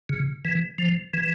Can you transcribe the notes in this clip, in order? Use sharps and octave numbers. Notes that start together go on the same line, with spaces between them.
C#3
E3
F3
E3